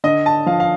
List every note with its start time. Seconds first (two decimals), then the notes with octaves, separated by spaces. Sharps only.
0.04 D3 D#5
0.26 A5
0.46 F3 F5
0.60 F5